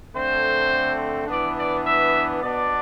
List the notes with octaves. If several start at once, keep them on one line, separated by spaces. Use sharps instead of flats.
D3 A3 C4 C5
E3 B3 D4 D5
D5
E5
B2 B3 D4 D5